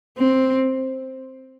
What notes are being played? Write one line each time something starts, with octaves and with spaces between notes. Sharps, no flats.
C4